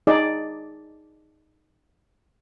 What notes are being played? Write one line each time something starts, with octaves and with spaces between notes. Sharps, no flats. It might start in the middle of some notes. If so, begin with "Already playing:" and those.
D#4 G#4 D5